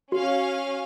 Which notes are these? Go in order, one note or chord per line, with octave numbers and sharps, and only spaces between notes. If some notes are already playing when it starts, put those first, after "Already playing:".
C#4 F#4 F5